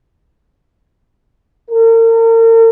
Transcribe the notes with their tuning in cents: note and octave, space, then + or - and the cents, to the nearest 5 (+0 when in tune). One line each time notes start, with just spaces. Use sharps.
A#4 -40